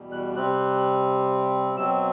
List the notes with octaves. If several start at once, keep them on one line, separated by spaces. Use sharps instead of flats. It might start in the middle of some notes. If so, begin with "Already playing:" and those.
Already playing: E2 B2 G3
F#6
C3 G3 C4 F#6
B2 F#3 C4 E6